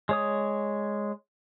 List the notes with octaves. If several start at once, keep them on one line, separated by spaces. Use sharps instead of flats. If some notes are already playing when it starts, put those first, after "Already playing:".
G#3 C#5 D#6